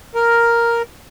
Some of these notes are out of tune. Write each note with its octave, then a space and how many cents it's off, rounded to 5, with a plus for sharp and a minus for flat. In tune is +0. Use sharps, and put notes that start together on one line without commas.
A#4 +0